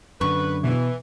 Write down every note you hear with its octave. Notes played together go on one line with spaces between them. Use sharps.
F#2 D3 B4 C#6
B2 E3